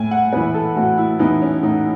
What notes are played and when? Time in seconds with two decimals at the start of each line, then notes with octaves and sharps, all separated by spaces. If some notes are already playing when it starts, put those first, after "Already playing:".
Already playing: A2 G#5
0.11 F#5
0.33 E3 B3 B4
0.54 A4
0.76 A2 F#4
0.98 E4
1.19 E3 B3 D#4
1.41 C#4
1.63 A2 D#4